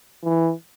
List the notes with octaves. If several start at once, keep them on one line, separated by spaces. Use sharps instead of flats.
E3